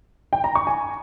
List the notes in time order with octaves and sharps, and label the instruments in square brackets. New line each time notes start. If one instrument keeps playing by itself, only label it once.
[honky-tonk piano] G5
A#5
C#6
G#5